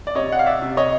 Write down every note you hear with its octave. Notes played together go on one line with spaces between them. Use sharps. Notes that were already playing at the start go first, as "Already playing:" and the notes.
D5
C3 C#5 D#5
F#5
F5
D5 E5
C3
C#5 D#5